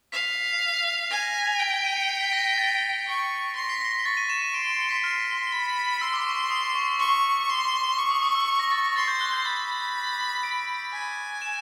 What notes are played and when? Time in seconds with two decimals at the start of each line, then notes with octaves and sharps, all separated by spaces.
0.12 F5 B6
1.10 G#5 A#6
1.23 A#6
1.35 B6
1.47 F7
1.59 G5 D7
1.84 D#7
1.97 C#7
2.09 C7
2.21 B6
2.33 A#6
2.46 A#6
2.58 A6
3.07 C#6
3.56 C6 A#6
3.69 B6
3.81 A#6
4.05 C#6 A6
4.17 D#7
4.29 E7
4.42 D#7
4.54 C6 D7
4.66 D7
4.79 C#7
4.91 B6
5.04 C6 F6
5.52 B5
6.01 C6 E6
6.13 D6
6.26 C#6
6.38 D6
6.51 D#6
6.63 D6
6.75 C#6
6.88 C#6
6.99 C#6 D6
7.49 C6
7.98 C#6 D6
8.11 D#6
8.22 D#6
8.35 E6
8.47 E6
8.59 A#6
8.72 A6
8.84 A#6
8.96 C6 A6
9.08 G6
9.21 F#6
9.33 G6
9.45 B5 A6
10.43 D7
10.93 G#5
11.42 E7